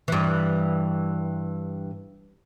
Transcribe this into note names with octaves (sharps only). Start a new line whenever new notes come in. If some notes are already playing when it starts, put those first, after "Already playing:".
G2 E3